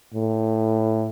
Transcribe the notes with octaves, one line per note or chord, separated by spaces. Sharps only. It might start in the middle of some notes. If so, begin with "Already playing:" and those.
A2